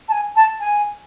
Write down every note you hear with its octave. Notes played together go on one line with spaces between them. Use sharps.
A5
G#5
A5
G#5